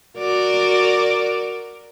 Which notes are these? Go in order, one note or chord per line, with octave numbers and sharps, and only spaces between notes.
F#4 A#4 D5